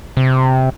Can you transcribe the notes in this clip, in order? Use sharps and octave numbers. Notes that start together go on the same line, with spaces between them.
C3